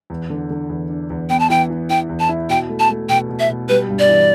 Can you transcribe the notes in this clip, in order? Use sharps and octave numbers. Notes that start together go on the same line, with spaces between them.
E2
D3
D3
E2
D4
E2
B3 G5
A5
E3 G5
E3
E4 G5
E2
A5
E4
B2 G5
A3
A5
A3
B2 G5
B2
E5
B2
G3 B4
G2
D5
E3